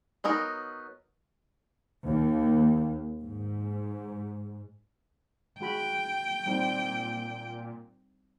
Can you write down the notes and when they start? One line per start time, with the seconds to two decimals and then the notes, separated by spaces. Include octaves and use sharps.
0.24 F#3 B3 D#4 A#4
2.06 D#2
3.22 G#2
5.61 G#3 F#4 G5 B5
6.46 A#2 G3 C4 D#4